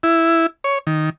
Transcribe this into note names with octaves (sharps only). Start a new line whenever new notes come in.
E4
C#5
D#3